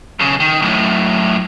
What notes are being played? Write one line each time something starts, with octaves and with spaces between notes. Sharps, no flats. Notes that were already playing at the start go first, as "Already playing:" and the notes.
B1 C#3
D#3
F#2 A2